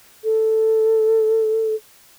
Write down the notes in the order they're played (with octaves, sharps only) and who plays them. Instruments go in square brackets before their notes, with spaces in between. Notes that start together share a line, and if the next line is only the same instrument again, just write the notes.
[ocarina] A4